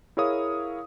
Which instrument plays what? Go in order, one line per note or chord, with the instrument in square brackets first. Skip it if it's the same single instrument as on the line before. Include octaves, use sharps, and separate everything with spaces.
[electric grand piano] E4 G#4 A#4 C#5 F5 D#6